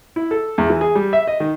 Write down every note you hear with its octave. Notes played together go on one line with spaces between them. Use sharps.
E4
A4
E2
E3
G#4
G3
E5
D#5
D#3